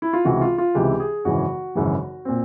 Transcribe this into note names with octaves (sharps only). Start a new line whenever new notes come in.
E4
F4
C#2 C3 E3 F#4
F4
F4
C#2 C3 E3 G4
G#4
G#1 F#2 C#3 E3 F#4
G#1 F#2 C#3 E3
A#2 C4